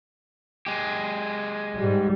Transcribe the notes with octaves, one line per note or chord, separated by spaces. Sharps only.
G#3 G4
G#2 G3